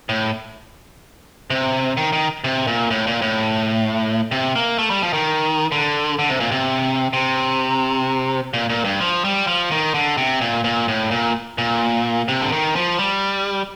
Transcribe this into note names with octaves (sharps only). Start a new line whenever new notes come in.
A2
C3
D#3
D#3
C3
A#2
A2
A#2
A2
C3
A#3
A3
G3
F3
D#3
D3
D3
C3
A#2
C3
C3
A#2
A#2
G2
F3
G3
F3
D#3
D3
C3
A#2
A#2
A2
A#2
A#2
C3
D3
D#3
F3
G3